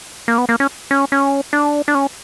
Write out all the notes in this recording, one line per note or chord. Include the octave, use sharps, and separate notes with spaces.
A#3
B3
A#3
C#4
C#4
C#4
D4
D4
C#4